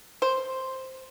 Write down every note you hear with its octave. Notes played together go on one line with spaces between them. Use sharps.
C5